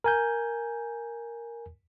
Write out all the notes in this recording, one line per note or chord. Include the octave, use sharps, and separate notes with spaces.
A#4 G#5 G6